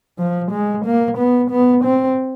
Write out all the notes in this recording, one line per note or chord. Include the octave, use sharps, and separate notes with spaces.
F3
G#3
A#3
B3
B3
C4